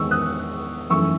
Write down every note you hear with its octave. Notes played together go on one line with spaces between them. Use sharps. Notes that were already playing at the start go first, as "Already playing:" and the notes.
Already playing: E2 D#3 G#3 C#6 E6
D#6 F#6
F#2 E3 A3 C#6 E6